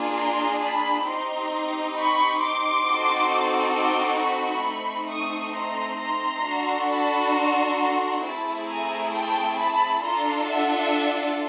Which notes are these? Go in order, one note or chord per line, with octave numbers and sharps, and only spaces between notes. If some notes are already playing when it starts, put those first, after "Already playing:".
Already playing: A#3 D4 F4 G#4
A#5 C6
A5 B5
C4 D#4 G4 A#5 C6
B5 C#6
C6 D6
C4 D#4 F#4 A4
C6 D6
B5 C#6
A3 C4 D#4
C#6 D#6
A#5 C6
A#5 C6
D4 F#4 A4
A5 B5
A#5 C6
A3 C4 E4 G#4 A5 B5
G#5 A#5
G5 A5
A5 B5
D4 F4 A4 A#5 C6
E5 F#5